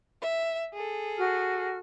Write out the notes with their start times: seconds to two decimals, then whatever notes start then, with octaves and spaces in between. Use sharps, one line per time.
0.21 E5
0.73 G#4 A4
1.17 F#4 F6